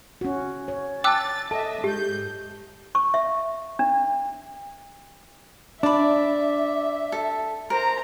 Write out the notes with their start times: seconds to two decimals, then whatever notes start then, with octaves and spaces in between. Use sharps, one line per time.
0.21 C#4 F#4
0.68 C#5
1.04 G5 A5 D6 E6 F#6 A6
1.51 A4 D#5 E5 A5
1.84 G#2 G4 G6
2.95 C#6
3.14 E5
3.79 D4
5.83 D4 D5 E5 B5
7.12 A4
7.70 A#4 C5 A#5